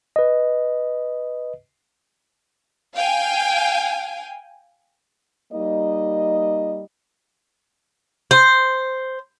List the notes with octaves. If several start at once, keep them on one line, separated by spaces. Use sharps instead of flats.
B4 D#5
F5 G5 G#5
G3 A#3 D#4 D#5
C5